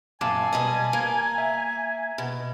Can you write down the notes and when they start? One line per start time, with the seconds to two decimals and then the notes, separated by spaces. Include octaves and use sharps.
0.21 F#2 A#2 F5 G#5 A5 D6
0.53 B2 G3 D#5
0.93 A#3
1.38 E5
2.18 B2